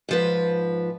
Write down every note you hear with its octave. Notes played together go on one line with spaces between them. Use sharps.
G#2 F3 B4